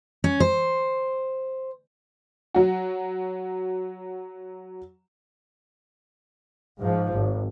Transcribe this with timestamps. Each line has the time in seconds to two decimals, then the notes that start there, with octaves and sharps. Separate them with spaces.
0.24 C#4
0.40 C5
2.54 F#3 F#4
6.79 G#2 F3
7.12 G#1